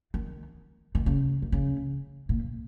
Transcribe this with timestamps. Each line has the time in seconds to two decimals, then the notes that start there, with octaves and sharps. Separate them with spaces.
0.14 D#3
0.95 D#3
1.06 C#3
1.42 D#3
1.52 C#3
2.29 A#2